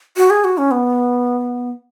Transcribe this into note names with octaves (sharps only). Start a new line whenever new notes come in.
F#4
G#4
F#4
C#4
B3